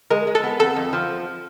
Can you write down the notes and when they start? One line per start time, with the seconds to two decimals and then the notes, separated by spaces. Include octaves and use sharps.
0.10 G#3 A#4
0.27 G#3
0.35 A4
0.43 B3
0.59 F2 A4
0.76 F2
0.93 F3